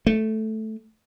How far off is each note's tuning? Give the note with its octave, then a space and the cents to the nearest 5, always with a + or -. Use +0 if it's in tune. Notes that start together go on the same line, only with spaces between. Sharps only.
A3 -5